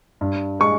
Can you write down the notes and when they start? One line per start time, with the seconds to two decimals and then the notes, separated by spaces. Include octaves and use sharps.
0.21 G2
0.60 G#3 C#6